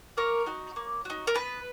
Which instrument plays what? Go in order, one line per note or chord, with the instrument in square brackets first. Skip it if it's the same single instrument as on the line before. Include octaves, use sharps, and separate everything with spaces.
[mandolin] A#3 A#4 C#5
D#4 F#4
A#3
D#4 F#4
A#4
B3 B4